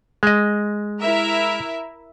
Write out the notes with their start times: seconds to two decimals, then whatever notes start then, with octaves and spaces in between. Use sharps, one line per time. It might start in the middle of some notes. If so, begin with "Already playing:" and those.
0.23 G#3 D#5
1.01 E4 A#4 E5